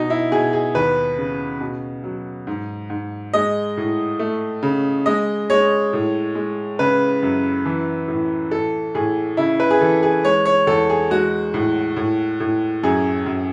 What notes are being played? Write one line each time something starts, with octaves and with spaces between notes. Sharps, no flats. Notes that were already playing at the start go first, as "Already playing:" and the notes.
Already playing: B2 D#4
E4
B2 G#4
G#4
D#2 B4
C#3
B2
F#3
G#2
G#2
G#3 D#5
A2
A3
C#3
G#3 D#5
G#3 C#5
A2
G#3
C#3 B4
F#2
E3
A2
A2 A4
A2 G#4
C#3 E4
B4
G#4
E3 A4
G#4
G#3 C#5
C#5
E2 A4
G#4
G#3 F#4
A2
A2
A2
F#2 G#4
F#2